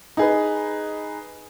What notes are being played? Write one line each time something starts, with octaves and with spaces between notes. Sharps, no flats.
D#4 G#4 B4